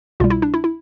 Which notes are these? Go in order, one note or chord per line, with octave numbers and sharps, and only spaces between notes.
C2 B2 G3 F4
E4
D4
E4
E4